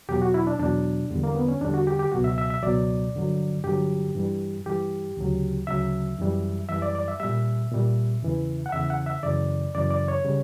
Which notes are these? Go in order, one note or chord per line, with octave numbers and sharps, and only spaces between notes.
E2 B2 F#3 G4
F#4
E4
D4
E2 B2 F#3 D4
E2 D3 G3
A#3
B3
C#4
E2 D3 G3 D4
F#4
G4
G4
C#2 B2 F#3 F#4
E5
E5
E5
C#2 B2 F#3 D5
G2 D3 F#3
G2 D3 F#3 G4
G2 E3 G3
G2 E3 G3 G4
D2 C#3 F#3
D2 C#3 F#3 E5
F#2 E3 G3
F#2 E3 G3 E5
D5
D5
E5
A#2 G3 E5
A#2 G3
E2 C#3 E3
F#5
E2 C#3 E3 E5
F#5
E5
F#2 C#3 E3 D5
F#2 C#3 E3 D5
D5
C#5
C#3 G3